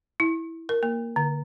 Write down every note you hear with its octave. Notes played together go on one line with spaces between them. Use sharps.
E4
A#4
A#3
D3